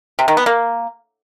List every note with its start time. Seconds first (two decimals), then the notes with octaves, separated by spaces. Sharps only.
0.19 C3
0.28 D#3
0.37 B3
0.46 A#3